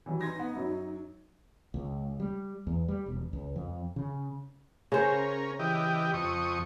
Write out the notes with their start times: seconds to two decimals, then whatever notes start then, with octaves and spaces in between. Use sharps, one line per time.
0.06 E3 F#3 G3
0.21 D#4 C6 G#6 A#6
0.40 B3
0.54 F#2 F#3
1.74 C#2
2.20 G3
2.67 E2
2.88 G3
3.06 E1
3.33 C#2
3.56 F2
3.96 C#3
4.92 C#3 C#4 A#4 C5
5.59 E3 G4 D#5
6.14 F2 C#6 D#6